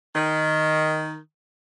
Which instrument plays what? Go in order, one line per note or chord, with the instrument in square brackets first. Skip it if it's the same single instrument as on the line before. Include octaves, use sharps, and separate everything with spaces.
[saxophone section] D#3